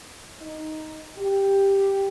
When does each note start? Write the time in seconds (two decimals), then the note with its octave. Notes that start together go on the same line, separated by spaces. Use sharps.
0.42 D#4
1.18 G4